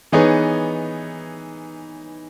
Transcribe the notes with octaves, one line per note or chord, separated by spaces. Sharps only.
E3 B3 D#4 G#4 C#5